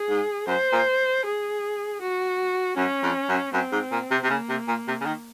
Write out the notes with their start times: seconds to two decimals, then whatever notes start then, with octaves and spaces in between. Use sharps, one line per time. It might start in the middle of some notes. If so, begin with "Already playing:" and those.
Already playing: G#4
0.09 G#2
0.47 F#2 C5
0.72 A#2
1.24 G#4
2.00 F#4
2.76 F#2 C#4
3.03 F2
3.29 F#2
3.53 F#2 C4
3.72 G#2
3.92 A#2
4.11 C3
4.24 C3
4.30 C#3 A#3
4.49 C3
4.68 A#2
4.88 C3
5.01 C#3
5.06 D#3